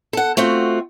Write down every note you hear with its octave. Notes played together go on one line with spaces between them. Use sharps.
A4 F#5
A3 C4 F4 F#4